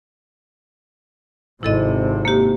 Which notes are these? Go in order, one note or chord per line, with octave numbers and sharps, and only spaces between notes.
G#1 C3 E4 A4 D#5
A#3 G4